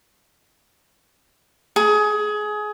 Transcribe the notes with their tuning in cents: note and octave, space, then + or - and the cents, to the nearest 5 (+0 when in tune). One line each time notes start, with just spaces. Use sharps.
G#4 +20